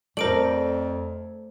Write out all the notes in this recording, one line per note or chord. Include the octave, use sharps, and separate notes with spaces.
F2 A3 A#4 C5 D5 D7 F#7